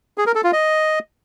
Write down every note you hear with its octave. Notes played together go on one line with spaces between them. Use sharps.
G#4
A#4
A4
F4
D#5